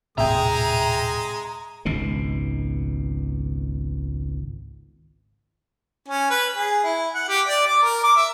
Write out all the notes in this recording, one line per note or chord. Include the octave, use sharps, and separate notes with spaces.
D#1 A2 C3 G#3 E5 G5 A#5 D#6
G#1 C#2 B2 D#3
C#4
B4
G#4
E4
F#5
G4
D5
D6
A#4
D6
E5